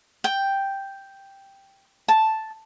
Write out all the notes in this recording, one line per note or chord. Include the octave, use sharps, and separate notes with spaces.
G5
A5